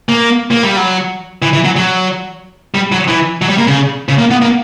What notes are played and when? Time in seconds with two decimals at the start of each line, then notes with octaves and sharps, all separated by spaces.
0.09 A#3
0.51 A#3
0.63 G3
0.76 F#3
1.42 E3
1.53 E3
1.64 F#3
1.76 F#3
2.75 G3
2.92 F#3
3.08 E3
3.42 F#3
3.49 G3
3.58 A#3
3.67 C#3
4.09 C#3
4.18 A#3
4.31 B3
4.42 A#3